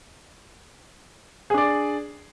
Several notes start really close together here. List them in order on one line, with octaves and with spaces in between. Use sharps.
G#4 D4 D5